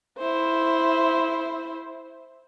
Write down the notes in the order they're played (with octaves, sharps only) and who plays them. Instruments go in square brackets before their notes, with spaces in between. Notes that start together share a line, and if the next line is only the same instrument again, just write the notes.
[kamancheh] E4 C5